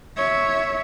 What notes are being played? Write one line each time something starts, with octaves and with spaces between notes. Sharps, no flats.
C#5 E5